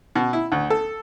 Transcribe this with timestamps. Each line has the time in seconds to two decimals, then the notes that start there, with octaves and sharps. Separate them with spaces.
0.16 B2
0.33 E4
0.52 D2
0.70 A4